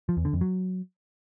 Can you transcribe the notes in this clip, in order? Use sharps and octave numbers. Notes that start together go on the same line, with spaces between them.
F3
E2
D3
F2
F#3